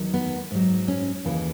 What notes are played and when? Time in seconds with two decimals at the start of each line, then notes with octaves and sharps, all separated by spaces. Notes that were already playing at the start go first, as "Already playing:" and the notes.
Already playing: E2 D#3 F#3
0.14 B3
0.51 G#2 F#3
0.88 C#4
1.25 D#2 C#3 E3